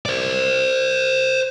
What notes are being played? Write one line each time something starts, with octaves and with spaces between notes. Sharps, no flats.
C5 D5